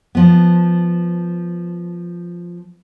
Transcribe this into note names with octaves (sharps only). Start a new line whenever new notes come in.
F3 B3